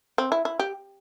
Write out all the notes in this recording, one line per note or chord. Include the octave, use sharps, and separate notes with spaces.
C4
E4
E4
G4